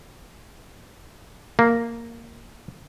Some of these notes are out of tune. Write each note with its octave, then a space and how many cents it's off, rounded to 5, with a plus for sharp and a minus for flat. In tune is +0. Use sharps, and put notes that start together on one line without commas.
A#3 -5